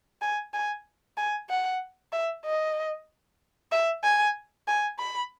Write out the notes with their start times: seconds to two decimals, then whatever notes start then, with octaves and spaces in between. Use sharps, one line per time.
0.22 G#5
0.54 G#5
1.17 G#5
1.49 F#5
2.12 E5
2.45 D#5
3.72 E5
4.04 G#5
4.68 G#5
4.99 B5